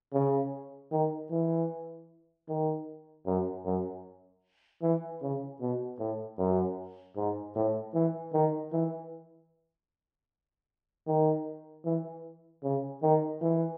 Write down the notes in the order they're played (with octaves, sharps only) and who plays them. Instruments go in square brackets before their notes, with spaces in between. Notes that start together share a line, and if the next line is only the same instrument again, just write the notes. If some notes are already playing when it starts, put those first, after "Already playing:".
[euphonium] C#3
D#3
E3
D#3
F#2
F#2
E3
C#3
B2
A2
F#2
G#2
A2
E3
D#3
E3
D#3
E3
C#3
D#3
E3